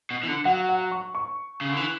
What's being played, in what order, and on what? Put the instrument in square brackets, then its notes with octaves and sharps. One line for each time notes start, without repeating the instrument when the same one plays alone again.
[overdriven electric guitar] B2
E3
D3
[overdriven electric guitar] F#3 [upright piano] F#5
[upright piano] F#5
C#6
C#6
[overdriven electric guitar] C#3
D3
E3